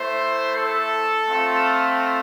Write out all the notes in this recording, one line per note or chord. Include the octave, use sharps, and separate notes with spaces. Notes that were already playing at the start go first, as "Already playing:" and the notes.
Already playing: A3 E4 C5
A4
A3 C4 F4